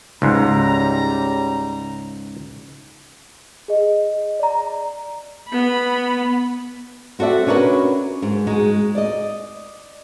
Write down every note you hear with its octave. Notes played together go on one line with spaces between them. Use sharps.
C#2 G#2 C#3 G3 A#5
G#4 D#5
D5 A#5
B3 B5
C4 F#4 A4 D5 E5
C#4 D4 F#4 A#4 B4
G#2
G#3 D#4 F#4
D5 D#5